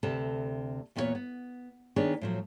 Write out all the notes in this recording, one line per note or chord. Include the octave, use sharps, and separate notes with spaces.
D2 C3 A4 B4 A5
E2 A#2 B3 F4 B4 C#5
B3
D#3 B3 D4 G#4 C#5
A2 F3 F#3